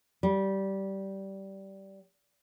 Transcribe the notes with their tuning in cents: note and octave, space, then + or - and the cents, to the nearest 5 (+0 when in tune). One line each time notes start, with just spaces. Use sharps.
G3 -15